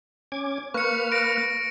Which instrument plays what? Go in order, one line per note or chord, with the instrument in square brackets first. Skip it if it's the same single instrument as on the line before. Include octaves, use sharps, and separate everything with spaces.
[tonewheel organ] C#4 D6 G#6
[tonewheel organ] A#3 B4 F6 [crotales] C#6 C#7
[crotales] A#6 D7